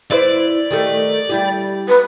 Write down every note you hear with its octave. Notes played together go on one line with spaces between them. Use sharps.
E4 B4 C5 D5
D#3 G3 A3
G3 E4 G4
B4